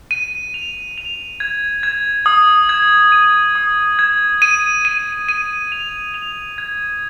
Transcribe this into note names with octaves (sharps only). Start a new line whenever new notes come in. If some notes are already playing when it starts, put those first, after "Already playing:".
D#7
F7
F7
G#6
G#6
D#6
G#6
D#7
D#6
G#6
D#7
D#7
D#7
F7
F7
G#6